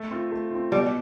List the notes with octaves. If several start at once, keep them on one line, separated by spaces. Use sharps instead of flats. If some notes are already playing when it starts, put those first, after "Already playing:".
Already playing: A3
C4 F4
A3
C4 F4
B2 G3